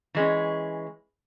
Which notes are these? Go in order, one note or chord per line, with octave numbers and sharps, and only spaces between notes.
E3 G#3 C#4